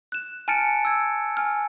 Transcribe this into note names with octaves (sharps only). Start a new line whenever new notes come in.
F#6 E7
G#5 A5 F6 A6 C#7 D7
E6 G#6
G#5 F6